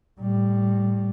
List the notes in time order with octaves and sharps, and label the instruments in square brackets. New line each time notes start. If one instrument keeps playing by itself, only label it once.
[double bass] A2 G3